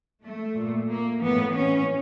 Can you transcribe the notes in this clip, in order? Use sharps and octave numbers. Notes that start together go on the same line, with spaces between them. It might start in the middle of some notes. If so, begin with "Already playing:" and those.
A3
A#2
A#3
A2 E3 B3
C#4